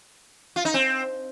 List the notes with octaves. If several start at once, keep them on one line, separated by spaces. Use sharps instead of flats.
F4
D#4
C4